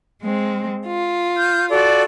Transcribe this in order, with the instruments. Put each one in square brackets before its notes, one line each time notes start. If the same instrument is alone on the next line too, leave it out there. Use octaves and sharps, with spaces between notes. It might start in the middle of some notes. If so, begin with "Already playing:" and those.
[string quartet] G#3 C4
F4
[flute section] F6 G6
F#4 A4 D5